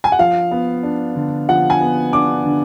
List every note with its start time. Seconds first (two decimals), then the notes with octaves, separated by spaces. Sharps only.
0.04 G#5
0.12 F#5
0.19 F3 F5
0.51 B3
0.83 D4
1.15 D3
1.49 F3 F#5
1.70 G#5
1.81 B3
2.13 D4 D6
2.45 D3